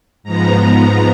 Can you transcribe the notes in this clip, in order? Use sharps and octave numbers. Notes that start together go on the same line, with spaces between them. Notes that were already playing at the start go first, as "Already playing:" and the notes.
G#2 F3 B3 A#5